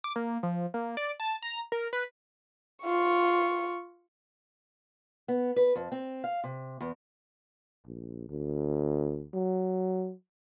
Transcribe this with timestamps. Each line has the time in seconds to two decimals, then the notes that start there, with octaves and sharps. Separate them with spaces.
0.04 D6
0.16 A#3
0.43 F3
0.74 A#3
0.97 D5
1.20 A5
1.42 A#5
1.72 A#4
1.93 B4
2.83 F4 C#6
5.28 B3
5.56 B4
5.75 F2
5.92 C4
6.24 F5
6.44 C3
6.80 E2
7.85 A#1
8.29 D2
9.34 F#3